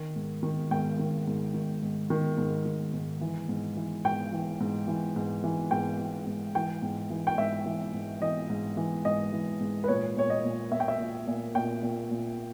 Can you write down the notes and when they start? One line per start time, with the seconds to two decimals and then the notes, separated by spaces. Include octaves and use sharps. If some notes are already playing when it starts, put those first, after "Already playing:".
Already playing: D#3
0.16 G#2
0.43 D#3
0.71 G#2 G5
0.99 D#3
1.27 G#2
1.54 D#3
1.82 G#2
2.10 D#3
2.38 G#2
2.66 D#3
2.93 G#2
3.21 E3
3.49 G#2
3.77 E3
4.05 G#2 G5
4.33 E3
4.60 G#2
4.88 E3
5.16 G#2
5.44 E3
5.71 G#2 G5
5.99 E3
6.26 G#2
6.55 E3 G5
6.82 G#2
7.10 E3
7.27 G5
7.38 G#2 E5
7.66 E3
7.94 G#2
8.22 E3 D#5
8.50 G#2
8.77 E3
9.05 G#2 D#5
9.33 E3
9.60 G#2
9.84 B4
9.88 A#2 C#5
10.16 A#2 C#5
10.30 D#5
10.44 A#2
10.72 A#2 E5
10.80 G5
10.88 E5
11.00 A#2
11.27 A#2
11.55 A#2 G5
11.83 A#2
12.11 A#2